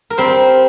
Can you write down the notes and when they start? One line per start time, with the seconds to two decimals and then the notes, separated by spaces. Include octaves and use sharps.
0.10 A#4
0.18 G3 C4 C5